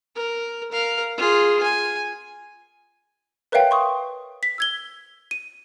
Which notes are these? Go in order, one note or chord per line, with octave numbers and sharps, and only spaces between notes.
A#4
A#4 F5
F4 G#4
G#5
A#4 B4 C#5 E5 F5 G5
C6 C#6 D#6
B6
E6 G#6 G7
D#7